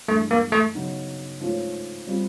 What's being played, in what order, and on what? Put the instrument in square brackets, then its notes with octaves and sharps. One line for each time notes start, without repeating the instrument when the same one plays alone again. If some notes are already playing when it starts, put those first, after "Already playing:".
[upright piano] G2 E3 G#3 [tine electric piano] A3
[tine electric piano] A#3
A3
[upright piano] C#3 F#3 B3 D#4 F#4
G#2 F3 A3 C#4 F4
G3 C4 F4